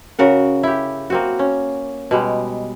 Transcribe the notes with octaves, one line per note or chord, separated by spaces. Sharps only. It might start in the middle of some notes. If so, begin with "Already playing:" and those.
C#3 F#4 A#4 F#5
E4 G4
A#3 C4 F#4
C#4
B2 G3 G#3